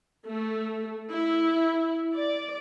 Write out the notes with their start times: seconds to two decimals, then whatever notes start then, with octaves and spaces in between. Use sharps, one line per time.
0.25 A3
1.11 E4
2.16 D5